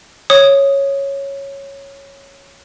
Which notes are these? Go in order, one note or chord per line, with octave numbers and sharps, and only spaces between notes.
C#5 D#6